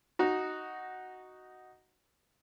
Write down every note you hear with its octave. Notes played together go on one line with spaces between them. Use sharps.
D#4 F#4